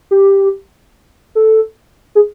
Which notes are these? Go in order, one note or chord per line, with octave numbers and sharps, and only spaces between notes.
G4
A4
G#4